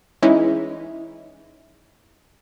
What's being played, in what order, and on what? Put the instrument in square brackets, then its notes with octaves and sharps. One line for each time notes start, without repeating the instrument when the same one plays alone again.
[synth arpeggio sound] E3 G#3 C#4 D#4 E4